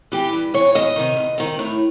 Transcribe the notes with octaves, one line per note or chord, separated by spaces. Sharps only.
E3 G4
G2
E3 C#5
E2 D#5
C3 D#3
E2
C3 D#3
A2